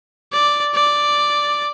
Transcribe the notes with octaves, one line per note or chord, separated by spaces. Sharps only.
D5
D5